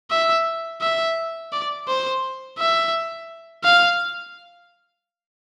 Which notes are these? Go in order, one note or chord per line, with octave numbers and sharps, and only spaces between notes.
E5
E5
D5
C5
E5
F5